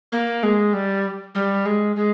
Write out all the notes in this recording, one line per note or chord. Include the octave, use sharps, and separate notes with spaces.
A#3
G#3
G3
G3
G#3
G#3